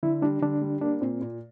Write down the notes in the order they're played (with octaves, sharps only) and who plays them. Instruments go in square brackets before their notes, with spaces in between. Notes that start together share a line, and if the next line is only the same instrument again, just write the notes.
[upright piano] D3 [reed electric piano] E4
[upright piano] G3 [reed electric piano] D4
[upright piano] D3 [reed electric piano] D4
[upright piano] G3
[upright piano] A#3 [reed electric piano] D4
[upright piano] A#2 [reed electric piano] C4
[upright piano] A#2